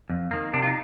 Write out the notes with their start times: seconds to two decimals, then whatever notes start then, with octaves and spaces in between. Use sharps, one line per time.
0.10 F2
0.31 D#3 A#3
0.53 C3 D4
0.62 F4
0.67 D#4